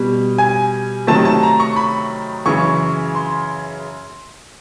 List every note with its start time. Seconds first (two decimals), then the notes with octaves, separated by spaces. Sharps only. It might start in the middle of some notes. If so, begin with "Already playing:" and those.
Already playing: B2 G3
0.38 G#5
1.07 C3 D#3 F#3 A3 A5
1.25 A5
1.43 A#5
1.60 C#6
1.76 B5
2.45 F#2 C#3 E3 G#3 C#6
3.15 C6